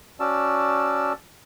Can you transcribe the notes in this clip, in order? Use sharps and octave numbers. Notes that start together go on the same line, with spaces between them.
C#4 F#4 D5 A5 E6